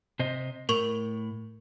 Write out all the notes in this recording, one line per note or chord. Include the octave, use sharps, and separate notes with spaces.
C3 C5 D#5
A2 A#4 C#6 F7